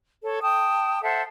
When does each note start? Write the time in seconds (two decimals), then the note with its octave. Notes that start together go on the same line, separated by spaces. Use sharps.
0.23 A4 C#5
0.42 G5 A5 D#6
1.02 A4 C5 E5 F#5